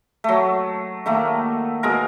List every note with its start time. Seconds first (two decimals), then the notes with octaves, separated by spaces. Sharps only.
0.24 F#3 A3
1.06 D#3 A3 A#3
1.83 B2 G#3 A#4